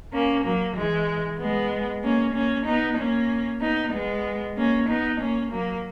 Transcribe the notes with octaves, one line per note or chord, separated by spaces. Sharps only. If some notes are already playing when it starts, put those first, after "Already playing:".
A#3 C#4
F#3 A#3
E3 G#3
G#3 B3
A#3 C#4
A#3 C#4
B3 D#4
A#3 C#4
B3 D#4
G#3 B3
A#3 C#4
B3 D#4
A#3 C#4
F#3 A#3